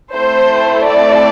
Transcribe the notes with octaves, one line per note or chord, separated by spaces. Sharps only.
A3 C4 E4 A4 C5
D5